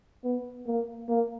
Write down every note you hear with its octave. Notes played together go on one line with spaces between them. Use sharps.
B3
A#3
A#3